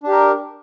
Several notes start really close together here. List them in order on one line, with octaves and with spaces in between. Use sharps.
D4 G4 A#4